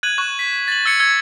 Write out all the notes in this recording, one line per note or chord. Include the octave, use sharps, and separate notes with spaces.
F#6 G#6 D#7 F#7
C#6 F#6
B6
A6 F#7
E6 G#6 C#7
E6 G#6